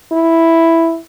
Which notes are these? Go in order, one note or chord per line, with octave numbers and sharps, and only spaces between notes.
E4